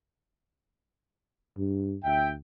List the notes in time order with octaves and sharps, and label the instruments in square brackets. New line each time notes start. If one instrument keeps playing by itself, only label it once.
[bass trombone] G2
[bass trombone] D2 [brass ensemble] E5 G5